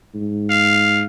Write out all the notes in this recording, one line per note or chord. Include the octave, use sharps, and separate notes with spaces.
G#2
F5